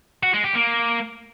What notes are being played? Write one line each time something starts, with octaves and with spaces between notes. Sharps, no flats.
F#4
G#3
G4
A#3